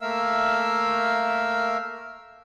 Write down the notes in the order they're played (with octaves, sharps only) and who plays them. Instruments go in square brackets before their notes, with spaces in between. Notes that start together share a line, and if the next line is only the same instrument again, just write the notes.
[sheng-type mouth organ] A3 A#3 A#4 E5 F5 E6